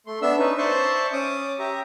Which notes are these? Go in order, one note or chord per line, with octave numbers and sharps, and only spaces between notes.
A3 C6
B3 D4 E5 E6
C#4 D#4 B4
C5 D5 E5 A5 C6 C#6
C#4 D6 D#6
G4 E5 A#5